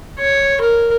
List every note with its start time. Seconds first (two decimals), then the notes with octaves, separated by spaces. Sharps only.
0.19 C#5
0.61 A#4